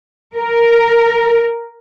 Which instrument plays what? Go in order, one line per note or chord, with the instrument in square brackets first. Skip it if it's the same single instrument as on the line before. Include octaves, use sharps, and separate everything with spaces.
[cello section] A#4